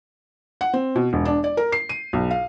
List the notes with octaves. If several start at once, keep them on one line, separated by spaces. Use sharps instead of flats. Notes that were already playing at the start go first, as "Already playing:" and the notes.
F#5
C4
B2
E1
D4
D5
A#4
C7
D#7
B1
F5